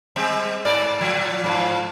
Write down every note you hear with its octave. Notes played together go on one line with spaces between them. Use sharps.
G3 G#3 C4
G#2 A#4 D5
A#2 F3
G#2 F3